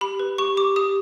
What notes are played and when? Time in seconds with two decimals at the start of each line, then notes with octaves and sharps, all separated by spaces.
0.01 G4 B5
0.19 B4
0.38 G4 C#6
0.57 G4 D6
0.76 G4 D#6